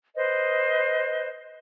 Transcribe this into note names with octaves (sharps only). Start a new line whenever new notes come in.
B4 C5 D#5